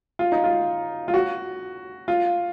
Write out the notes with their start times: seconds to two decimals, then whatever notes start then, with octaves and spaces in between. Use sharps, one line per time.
0.19 F4
0.32 D#4
0.44 F4
1.08 F4
1.14 F#4
2.08 F4